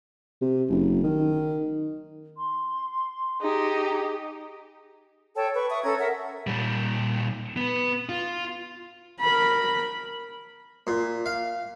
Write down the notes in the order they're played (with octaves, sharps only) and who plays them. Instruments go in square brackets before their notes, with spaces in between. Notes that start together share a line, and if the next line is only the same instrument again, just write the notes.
[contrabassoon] C3
F#1
D#3
[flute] C6
[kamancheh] D#4 G4 [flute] G#4
[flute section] A4 C#5 G5 A5
B4 C#6
E5 C#6 D#6
C#4 A4 A#5 G#6
A#4 E5 F#5
[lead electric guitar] A#2 G3
B3 B4
F4
[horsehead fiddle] A#4 B5
[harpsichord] A#2
F5